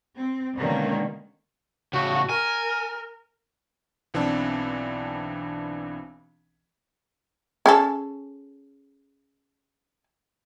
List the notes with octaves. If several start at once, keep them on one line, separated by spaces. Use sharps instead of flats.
C4
B2 D3 D#3 G#3 A#3 C#4
A2 C#3 F#4
A#4 G#5
B1 E3 C4 D4 A5
C#4 G#4 A4